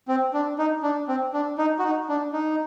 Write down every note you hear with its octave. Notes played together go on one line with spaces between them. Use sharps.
C4
D4
D#4
D4
C4
D4
D#4
F#4
D#4
D4
D#4